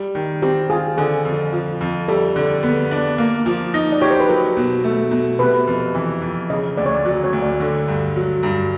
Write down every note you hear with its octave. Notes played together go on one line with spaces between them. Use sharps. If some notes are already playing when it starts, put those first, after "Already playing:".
Already playing: G3
D#3
C4 G4
F4 G#4
D3 G#4
F2
F3
F2
G3 A4
D3
B3
D4
A#3
F3
D#4
D5
G4 C#5
C5
B4
F#3 A#4
B2
A3
B2
C3 B4
F2
E3
F2
C#3 D#5
D2 D5
C#5
D5
F#3 D5
C#5
D2
D5
D3
G2
F#3
G2